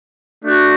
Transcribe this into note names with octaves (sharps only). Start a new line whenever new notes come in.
A3 D4 F#4